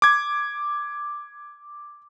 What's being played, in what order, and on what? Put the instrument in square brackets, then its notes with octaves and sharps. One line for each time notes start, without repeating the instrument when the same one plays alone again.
[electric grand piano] D6 G#6